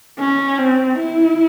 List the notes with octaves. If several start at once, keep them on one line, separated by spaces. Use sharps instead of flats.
C#4
C4
E4